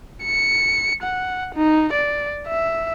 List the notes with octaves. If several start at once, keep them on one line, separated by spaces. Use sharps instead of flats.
C#7
F#5
D#4
D5
E5